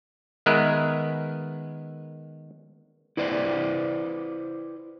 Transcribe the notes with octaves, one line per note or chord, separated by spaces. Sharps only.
D#3 G#3 B3 A#4 B4 E5
E4 B4 C5 D5